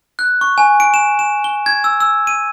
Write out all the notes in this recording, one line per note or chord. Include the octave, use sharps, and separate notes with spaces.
F#6
C#6
G#5
D7
E7
E7
G7
G#6
E6
E6
D#7